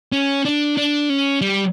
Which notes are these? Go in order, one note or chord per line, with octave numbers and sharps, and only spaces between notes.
C#4
D4
D4
C#4
G3